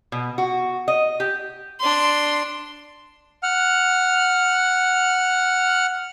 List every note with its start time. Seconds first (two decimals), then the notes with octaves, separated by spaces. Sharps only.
0.12 B2
0.38 F#4
0.88 D#5
1.20 G4
1.80 D4 C6
3.43 F#5 F6